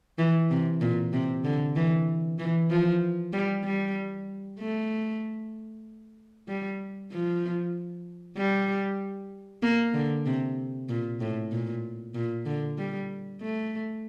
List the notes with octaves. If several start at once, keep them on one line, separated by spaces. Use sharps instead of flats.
E3
C3
A#2
C3
D3
E3
E3
F3
G3
G3
A3
G3
F3
G3
A#3
D3
C3
A#2
A2
A#2
A#2
D3
G3
A3